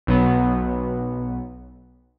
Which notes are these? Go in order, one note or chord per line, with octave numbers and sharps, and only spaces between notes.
B1 F#3 B3